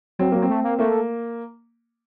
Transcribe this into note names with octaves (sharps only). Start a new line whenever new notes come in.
F#3 C4
F#3 A#3
C4
A3
A#3
A3 A#3